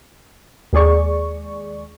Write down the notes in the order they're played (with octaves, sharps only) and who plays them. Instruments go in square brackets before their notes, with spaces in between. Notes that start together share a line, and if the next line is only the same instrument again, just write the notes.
[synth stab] D#2 G#3 G#4 D5 C#6